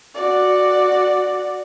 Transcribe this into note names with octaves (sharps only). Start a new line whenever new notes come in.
F#4 D5